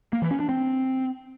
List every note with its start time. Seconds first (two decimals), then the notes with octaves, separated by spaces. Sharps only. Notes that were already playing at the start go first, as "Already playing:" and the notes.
0.13 A#3
0.22 E3
0.31 C#4
0.40 D4
0.49 C4